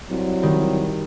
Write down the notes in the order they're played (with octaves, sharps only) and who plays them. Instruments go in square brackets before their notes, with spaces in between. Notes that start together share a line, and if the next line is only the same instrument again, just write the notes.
[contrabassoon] C2 [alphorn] F#3
[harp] D#3 [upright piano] G3